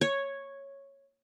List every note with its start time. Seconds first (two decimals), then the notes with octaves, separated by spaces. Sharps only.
0.01 C#5